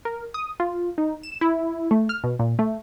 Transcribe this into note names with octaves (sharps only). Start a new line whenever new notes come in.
A#4
D#6
F4
D#4
E7
E4
A3
F6
B2
A#2
A3